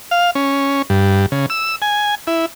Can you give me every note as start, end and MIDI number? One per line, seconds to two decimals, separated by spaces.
0.11 0.31 77
0.35 0.82 61
0.90 1.26 43
1.32 1.46 49
1.50 1.76 88
1.82 2.15 80
2.27 2.46 64